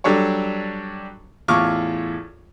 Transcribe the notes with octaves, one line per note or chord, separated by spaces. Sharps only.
F#3 G3 D4 A4 C#5
E2 A2 F4 C#6 D6 F6